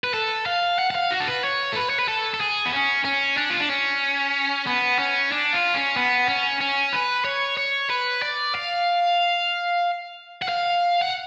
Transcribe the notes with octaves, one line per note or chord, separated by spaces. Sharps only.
B4
A4
F5
F#5
F#5
F5
F#4
A4
B4
C#5
A4
B4
C#5
B4
A4
A4
G#4
B3
C#4
C#4
D4
F4
D4
C#4
B3
C#4
D4
F4
C#4
B3
C#4
C#4
B4
C#5
C#5
B4
D5
F5
F#5
F5
F#5